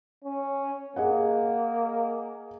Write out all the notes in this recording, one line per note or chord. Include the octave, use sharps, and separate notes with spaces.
C#4
A#3 G#4 D#5 F#5